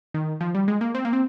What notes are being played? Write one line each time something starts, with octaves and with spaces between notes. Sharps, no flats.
D#3
F3
G3
G#3
A#3
C4
A#3
C4